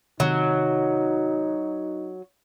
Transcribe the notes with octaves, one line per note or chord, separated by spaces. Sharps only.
C3 D#3 F#3 C4 D#4